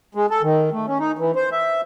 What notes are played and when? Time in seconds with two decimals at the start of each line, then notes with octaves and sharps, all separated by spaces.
0.15 G#3
0.30 A4
0.43 D#3
0.72 A3
0.86 C#4
1.00 D#4
1.19 E3
1.36 C5
1.52 E5